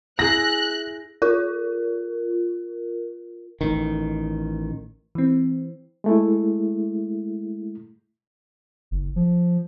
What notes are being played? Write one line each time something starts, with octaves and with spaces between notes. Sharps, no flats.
E4 G#4 F#6 A#6
F4 A#4
A1 D#3
E3 C4
G#3 A3 E4
F#1
F3